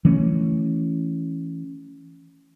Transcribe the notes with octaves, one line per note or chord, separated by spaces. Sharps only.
E3 A3 C#4